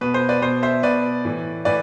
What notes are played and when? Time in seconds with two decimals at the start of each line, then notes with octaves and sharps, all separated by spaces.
0.01 B2 B4
0.14 C5
0.29 B4 D5
0.42 B2 C5
0.62 C5 E5
0.83 B2 B4 D5
1.25 A2 E3
1.65 A2 E3 B4 D5